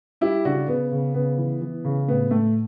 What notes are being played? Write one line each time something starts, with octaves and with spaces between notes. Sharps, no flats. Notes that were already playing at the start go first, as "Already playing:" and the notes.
G3 E4 G4
C#3 D4 F#4
C#3 B3
C#3
C#3 B3
E3
E3
C#3
A2 B3
A2 A3